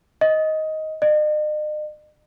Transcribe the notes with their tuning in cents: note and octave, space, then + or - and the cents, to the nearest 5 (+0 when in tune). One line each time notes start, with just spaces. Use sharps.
D#5 +10
D#5 -45